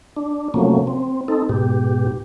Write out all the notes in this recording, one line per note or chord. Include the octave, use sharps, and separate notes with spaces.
D4
C3 F3 F#3 A3 A#3 C#4
C4
C4 D#4 A4
G#2 B2 G4